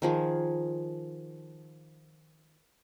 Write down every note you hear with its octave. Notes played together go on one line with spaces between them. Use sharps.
D#3 F3 G#4